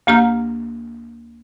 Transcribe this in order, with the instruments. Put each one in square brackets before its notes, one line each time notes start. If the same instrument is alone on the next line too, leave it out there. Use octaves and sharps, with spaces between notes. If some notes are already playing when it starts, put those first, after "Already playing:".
[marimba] D2 A#3 G4 A#5 F6